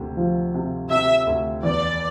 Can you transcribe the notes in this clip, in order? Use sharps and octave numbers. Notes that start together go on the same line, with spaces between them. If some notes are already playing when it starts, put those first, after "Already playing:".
Already playing: D2 C3
F3
C3
C3 E5
D2
E2 D5